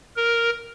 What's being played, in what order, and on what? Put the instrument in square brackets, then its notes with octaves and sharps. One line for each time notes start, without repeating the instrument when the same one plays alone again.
[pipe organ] A#4